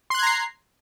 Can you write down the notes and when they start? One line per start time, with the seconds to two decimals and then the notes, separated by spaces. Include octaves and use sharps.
0.10 C6
0.14 F#6
0.19 G#6
0.23 A#5
0.27 C7